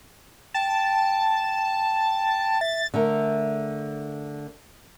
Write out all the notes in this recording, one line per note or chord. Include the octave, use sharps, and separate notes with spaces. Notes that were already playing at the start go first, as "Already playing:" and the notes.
G5 A5
E5 A6
D3 A3 A#4